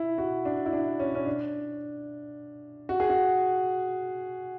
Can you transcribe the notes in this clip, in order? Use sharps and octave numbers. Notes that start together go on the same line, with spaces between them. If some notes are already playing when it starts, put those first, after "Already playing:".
Already playing: E4
F#4
D4
E4
D4
C#4
C#4
D4
F#4
G#4
F#4